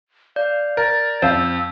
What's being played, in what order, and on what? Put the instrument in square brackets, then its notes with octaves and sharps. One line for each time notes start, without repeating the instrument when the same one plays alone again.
[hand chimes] D5 G6 [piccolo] F5
[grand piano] A#4 [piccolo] A6
[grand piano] F2 [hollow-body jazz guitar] C5 F5 [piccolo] E6